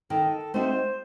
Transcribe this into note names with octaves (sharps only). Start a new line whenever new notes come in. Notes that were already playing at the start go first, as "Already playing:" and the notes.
D#3 A4
A3 C4 D#4 F#4 C5